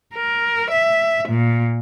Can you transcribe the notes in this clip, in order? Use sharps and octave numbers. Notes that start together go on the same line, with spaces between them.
A#4
E5
A#2